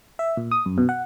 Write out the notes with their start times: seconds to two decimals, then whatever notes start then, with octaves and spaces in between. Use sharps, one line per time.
0.19 E5
0.37 A#2
0.51 D#6
0.66 F#2
0.78 B2
0.89 F#5